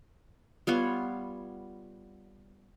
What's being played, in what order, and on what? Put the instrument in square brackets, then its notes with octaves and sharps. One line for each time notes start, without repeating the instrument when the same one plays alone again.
[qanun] G3 B3 F4 C#5